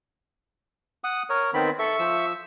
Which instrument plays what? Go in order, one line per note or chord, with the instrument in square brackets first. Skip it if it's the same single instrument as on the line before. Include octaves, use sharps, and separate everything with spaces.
[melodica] F#5 D#6
A#4 C#5
[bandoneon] D#3 B3 C4 [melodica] B5
[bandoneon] A4 [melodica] E5 C#6
[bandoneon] F3 E6